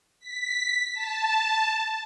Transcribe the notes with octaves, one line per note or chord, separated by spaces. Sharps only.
B6
A5